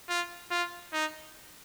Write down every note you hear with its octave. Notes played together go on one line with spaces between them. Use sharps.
F4
F4
D#4